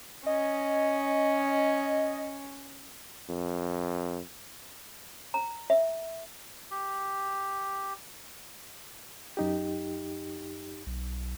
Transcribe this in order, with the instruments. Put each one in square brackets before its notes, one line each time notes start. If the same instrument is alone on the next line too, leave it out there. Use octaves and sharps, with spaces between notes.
[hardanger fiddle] C#4 [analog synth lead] D#5
[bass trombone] F2
[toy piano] A#5
E5
[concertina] G4
[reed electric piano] F#2 D#4 G4
[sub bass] B1